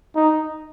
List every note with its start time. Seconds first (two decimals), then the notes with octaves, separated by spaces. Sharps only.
0.16 D#4